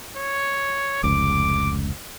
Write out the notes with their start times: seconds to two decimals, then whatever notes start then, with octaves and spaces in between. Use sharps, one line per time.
0.16 C#5
1.03 F1 C#2 D6